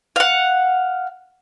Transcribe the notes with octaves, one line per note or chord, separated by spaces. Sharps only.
F5 F#5